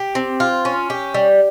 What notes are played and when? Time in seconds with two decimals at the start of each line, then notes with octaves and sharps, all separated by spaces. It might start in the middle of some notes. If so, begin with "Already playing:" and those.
Already playing: G4
0.15 C4
0.40 F4
0.65 C#4
0.90 G4
1.14 G3